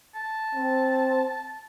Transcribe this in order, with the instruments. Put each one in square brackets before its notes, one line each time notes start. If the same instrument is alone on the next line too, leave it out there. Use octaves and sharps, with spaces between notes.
[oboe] A5
[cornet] C4